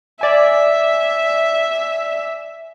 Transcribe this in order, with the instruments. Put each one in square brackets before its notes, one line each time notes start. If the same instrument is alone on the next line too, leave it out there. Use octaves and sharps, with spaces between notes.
[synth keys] D5 G#5 [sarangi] E5